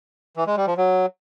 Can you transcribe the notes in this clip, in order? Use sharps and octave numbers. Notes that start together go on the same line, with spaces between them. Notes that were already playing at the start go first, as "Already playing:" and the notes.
E3
G#3
G3
F3
F#3